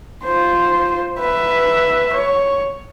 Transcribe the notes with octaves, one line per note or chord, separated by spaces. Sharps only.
F4 C5
B4 E5
C#5